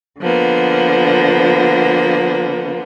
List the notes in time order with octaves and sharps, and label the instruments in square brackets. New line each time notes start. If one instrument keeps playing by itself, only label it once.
[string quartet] D3 F3 A#3 B3